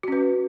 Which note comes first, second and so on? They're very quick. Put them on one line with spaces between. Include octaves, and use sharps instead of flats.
F#4 C#4 B4